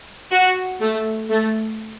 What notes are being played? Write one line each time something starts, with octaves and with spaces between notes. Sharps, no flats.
F#4
A3
A3